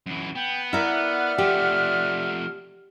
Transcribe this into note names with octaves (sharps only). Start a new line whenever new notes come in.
F#2 E3
B3 G5
E4 A#4 D5 E5 F#5 F6
F3 A3 G4